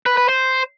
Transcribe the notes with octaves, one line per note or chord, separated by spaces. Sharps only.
B4
B4
C5